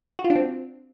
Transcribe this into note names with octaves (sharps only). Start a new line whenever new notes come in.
F#4
F4
D4
C4